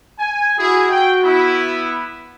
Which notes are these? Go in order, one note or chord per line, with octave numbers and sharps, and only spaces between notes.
G#5
E4 F#4 G#4
G5
B3 E4